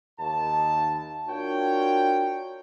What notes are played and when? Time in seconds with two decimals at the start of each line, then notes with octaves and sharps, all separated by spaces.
0.20 D#2 A5
1.29 D4 F4 F#4 A#4 C#5 G5